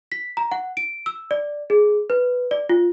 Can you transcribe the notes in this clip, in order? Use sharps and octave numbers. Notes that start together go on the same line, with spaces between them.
B6
A#5
F#5
D7
E6
D5
G#4
B4
D5
F4